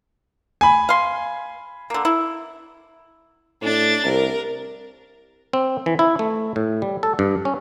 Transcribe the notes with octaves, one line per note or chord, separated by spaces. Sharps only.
G#5 B5
F5 C6
D3 A#3
E4
A2 D4 A6
C2 A#4
C4
E3
E4
A3
A2
G3
A4
G2
C#4